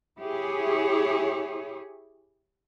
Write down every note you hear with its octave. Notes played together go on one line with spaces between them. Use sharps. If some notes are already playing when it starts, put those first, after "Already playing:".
E4 G4 G#4 C#5